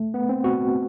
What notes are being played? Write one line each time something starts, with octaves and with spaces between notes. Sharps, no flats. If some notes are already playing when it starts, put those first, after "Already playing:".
Already playing: A3
B3
C4
F#4